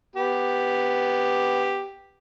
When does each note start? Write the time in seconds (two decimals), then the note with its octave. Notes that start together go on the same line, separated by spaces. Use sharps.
0.16 B3 G4